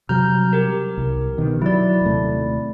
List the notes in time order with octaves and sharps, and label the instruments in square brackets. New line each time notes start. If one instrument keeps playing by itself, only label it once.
[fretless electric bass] C3 F#3 G3 [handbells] A#5 F6 G6
[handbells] G4 A#4
[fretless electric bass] C2
B2 D#3 B3
[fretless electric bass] F#3 [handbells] E4 D5
[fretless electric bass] D#1 C3 A3